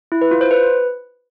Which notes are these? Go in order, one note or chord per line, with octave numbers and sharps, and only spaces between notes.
E4
B4
F4
C5
B4